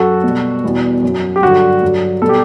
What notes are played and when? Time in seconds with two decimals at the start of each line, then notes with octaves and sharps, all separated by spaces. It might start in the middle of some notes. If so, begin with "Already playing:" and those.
Already playing: F#2 F#3 F#4 A4
0.23 B2 G3
0.64 E2 B2 G3
1.02 F#2 F#3
1.36 G4
1.42 G2 D3 F#3 F#4
1.82 G2 D3 F#3
2.22 B2 G3 A4
2.29 G4